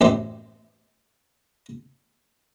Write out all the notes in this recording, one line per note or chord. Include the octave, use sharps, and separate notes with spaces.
A1 F#2 G4 C5